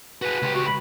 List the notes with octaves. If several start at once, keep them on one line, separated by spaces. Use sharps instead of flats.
F#4 G#4 B4
C#2 G4
F#4
B5